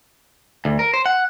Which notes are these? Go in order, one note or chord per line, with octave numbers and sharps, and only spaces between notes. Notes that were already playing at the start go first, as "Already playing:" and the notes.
D2
A#4
C5
F#5